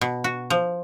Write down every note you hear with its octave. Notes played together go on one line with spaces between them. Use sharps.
B2
F#4
F3